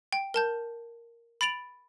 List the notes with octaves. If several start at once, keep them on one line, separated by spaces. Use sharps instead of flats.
G5
A#4 A5 G6
B5 A6 D7 F7 F#7